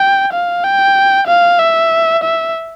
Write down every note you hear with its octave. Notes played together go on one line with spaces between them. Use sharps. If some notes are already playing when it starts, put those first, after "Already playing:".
Already playing: G5
F5
G5
F5
E5
E5